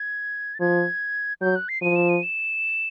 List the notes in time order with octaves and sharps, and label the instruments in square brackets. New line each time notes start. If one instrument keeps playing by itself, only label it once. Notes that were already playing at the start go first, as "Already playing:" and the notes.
Already playing: [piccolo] G#6
A6
[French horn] F3 [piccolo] G#6
[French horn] F#3 [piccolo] G6
[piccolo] F#6
C7
[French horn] F3 [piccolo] D#7
[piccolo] E7
D#7
E7